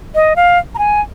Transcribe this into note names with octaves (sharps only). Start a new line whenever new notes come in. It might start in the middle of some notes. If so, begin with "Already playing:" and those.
D#5
F5
A#5
G#5